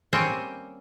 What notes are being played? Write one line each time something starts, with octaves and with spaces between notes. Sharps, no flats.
G3 A#3 C4 C#4 G5